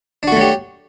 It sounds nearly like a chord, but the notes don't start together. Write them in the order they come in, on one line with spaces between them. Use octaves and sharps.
D4 F#4 A3 F#3 G4